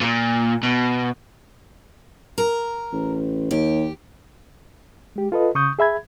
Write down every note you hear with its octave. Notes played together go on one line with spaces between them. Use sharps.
A#2
B2
A#4
A1
D#2 G4
G#3 G4
F4 A4 B4 D#5
C#3 C#6 D#6 G6
G#4 E5 B5 G#6